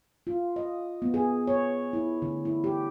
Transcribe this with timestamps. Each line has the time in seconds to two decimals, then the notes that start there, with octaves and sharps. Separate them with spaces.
0.27 F4
0.56 D#5
1.02 B3
1.14 G#4
1.47 C#5
1.93 E4
2.22 D3
2.45 E4
2.64 G4